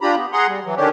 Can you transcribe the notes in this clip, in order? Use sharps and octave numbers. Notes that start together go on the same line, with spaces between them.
D4 F4 G4 A#5 B5
B3
G#4 F#5 A#5 C6
G3
E3 F#3
D3 D#3 C#4 D4 G4